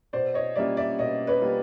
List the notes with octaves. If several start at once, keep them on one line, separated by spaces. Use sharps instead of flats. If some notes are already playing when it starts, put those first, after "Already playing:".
B2 C5 D5
C#5 D#5
G3 A#3 C#4 F4 D5 E5
D5 E5
B2 C#5 D#5
B4 C#5
G3 A#3 C#4 F4